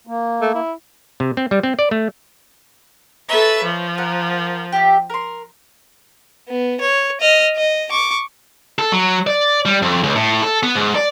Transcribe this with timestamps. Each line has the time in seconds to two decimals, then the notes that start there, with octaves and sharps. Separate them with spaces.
0.07 A#3
0.41 A3
0.55 E4
1.20 C3
1.37 C4
1.51 G3
1.63 C4
1.79 D5
1.91 A3
3.29 A4 B4 C#5 E5 A#5
3.63 F3
3.98 A#4 F#5
4.72 G4 E5
5.10 A#4 C6
6.48 B3
6.80 C#5
7.21 D#5 F6
7.56 D#5
7.90 C#6 D6
8.79 A4
8.92 F#3
9.27 D5
9.66 G3
9.82 F2
10.04 C#2
10.15 A2
10.43 A4
10.63 B3
10.75 G#2
10.95 D5